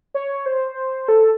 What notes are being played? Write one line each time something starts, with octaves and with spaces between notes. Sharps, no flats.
C#5
C5
A4